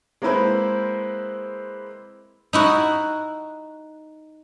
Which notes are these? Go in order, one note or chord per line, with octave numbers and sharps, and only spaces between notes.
G#3 A#3 C4 E4 B4 C5
D#4 E4 F#4